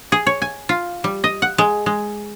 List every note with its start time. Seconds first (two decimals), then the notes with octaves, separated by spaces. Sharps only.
0.12 G#4
0.27 C#5
0.42 G#5
0.69 F4
1.04 G3
1.24 D#5
1.42 F#5
1.58 G#3
1.86 G#3